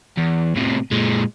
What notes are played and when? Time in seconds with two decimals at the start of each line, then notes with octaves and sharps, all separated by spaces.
0.17 E2
0.56 A2 C3
0.91 A#2 G#3